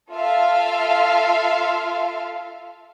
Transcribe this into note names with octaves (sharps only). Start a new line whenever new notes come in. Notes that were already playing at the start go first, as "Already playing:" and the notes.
F4 A4 E5 F5